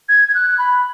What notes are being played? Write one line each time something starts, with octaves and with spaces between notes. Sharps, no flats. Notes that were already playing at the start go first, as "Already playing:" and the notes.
G#6
G#6
F#6
B5